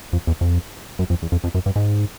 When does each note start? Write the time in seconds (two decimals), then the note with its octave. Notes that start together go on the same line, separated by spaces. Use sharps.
0.13 F2
0.27 E2
0.41 F2
0.99 F#2
1.10 F2
1.22 E2
1.32 F2
1.44 F2
1.55 F#2
1.66 G2
1.76 G#2